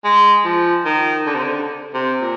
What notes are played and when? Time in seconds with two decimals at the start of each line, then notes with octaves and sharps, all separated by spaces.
0.04 G#3
0.45 F3
0.85 D#3
1.26 D3
1.35 C3
1.44 D3
1.94 C3
2.21 A#2